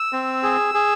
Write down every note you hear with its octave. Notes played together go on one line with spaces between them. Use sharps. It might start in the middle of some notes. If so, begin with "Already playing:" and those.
Already playing: E6
C4
G#4
G#4